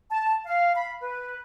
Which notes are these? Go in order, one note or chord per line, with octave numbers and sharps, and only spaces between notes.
A5
F5
B5
B4